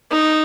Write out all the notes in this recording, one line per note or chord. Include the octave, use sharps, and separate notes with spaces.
D#4